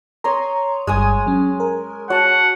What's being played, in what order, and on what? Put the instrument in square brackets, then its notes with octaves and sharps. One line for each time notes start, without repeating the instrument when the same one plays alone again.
[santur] C#5 D#5 C6 [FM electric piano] A#5
[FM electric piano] G1 G2 [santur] G#3 G#5 D#6
[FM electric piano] F#3 C#4
A#4
[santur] F#4 [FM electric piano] C#5 A5 [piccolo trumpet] F#5